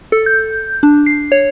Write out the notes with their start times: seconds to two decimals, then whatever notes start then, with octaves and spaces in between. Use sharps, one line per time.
0.12 A4
0.26 G6
0.83 D4
1.06 C7
1.32 C#5